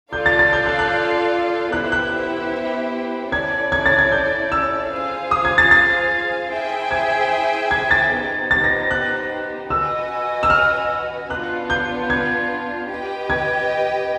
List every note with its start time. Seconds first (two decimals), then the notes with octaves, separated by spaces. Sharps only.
0.12 F4 A4 D5 F5 G6
0.26 A6
0.39 A6
0.53 G6
0.66 F#6
0.79 F#6
1.72 B3 E4 G4 C5 E5 F#6
1.92 F#6
3.32 C#4 E4 A4 D5 G#6
3.72 G#6
3.86 A6
3.99 G#6
4.12 G6
4.52 E6
4.91 F4 G#4 C5 F5
5.31 D#6
5.45 G#6
5.58 A6
5.71 A6
6.51 E4 G#4 C5 E5 G5
6.91 G#6
7.71 G#6
7.91 A6
8.11 B3 D#4 G4 C5
8.51 A6
8.64 A#6
8.91 F#6
9.70 F#4 B4 D#5 G#5 E6
10.43 E6
10.50 F6
11.30 B3 D4 F4 F#6
11.70 G6
12.10 G#6
12.89 G4 B4 D#5 G5
13.30 G#6